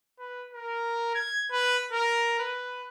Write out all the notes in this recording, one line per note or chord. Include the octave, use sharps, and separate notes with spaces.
B4
A#4
G#6
B4
A#4
B4